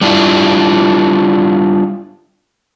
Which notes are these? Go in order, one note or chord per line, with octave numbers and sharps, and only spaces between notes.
G3 D4 E4 F4